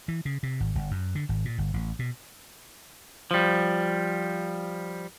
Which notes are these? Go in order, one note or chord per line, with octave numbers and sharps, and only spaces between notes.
E3
C#3
C3
G#1
G1
F#2
D3
G#1
A#2
G1
A1
B2
F3 G3